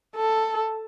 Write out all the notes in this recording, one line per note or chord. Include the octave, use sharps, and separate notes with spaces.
A4